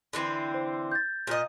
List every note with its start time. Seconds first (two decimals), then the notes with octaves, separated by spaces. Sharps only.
0.13 D3 E3 C4
0.54 C5
0.92 G6 A6
1.27 A#2 D#5